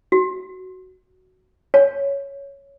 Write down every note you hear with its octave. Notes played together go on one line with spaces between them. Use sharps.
F#4
C#5